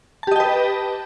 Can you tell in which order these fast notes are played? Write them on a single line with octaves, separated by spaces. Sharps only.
A5 G4 D#5 G5 B4